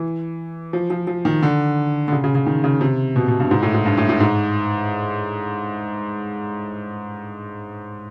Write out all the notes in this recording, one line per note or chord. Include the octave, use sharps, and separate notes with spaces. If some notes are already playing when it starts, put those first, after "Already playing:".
Already playing: E3
F3
F3
F3
D#3
D3
D3
C#3
C#3
C#3
D#3
C#3
C3
B2
B2
G2
G#2
A2
G#2
G2
A2
A2
G#2